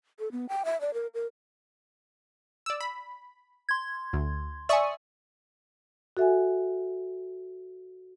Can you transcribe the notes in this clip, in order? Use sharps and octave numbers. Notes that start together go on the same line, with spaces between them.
A4
B3
G5
E5
D5
A#4
A#4
D5 E6
B5
C6 G#6
D2
D5 E5 G#5 C#6 D#6
F#4 A4 E5 F#5 G#5